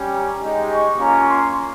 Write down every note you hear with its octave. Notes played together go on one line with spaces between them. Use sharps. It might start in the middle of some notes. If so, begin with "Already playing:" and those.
Already playing: G3 C#4 G4
A#5
G#3 D#4 G4
C#6
A#3 C#4 F4 A#5
C6